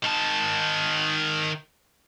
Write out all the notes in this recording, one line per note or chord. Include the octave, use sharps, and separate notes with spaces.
D#3 A5